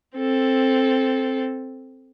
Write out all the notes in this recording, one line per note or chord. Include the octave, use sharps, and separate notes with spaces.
C4 A4